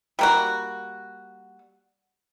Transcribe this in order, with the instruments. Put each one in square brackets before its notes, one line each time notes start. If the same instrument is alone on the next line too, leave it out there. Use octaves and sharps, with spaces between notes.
[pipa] G3 A#3 F#4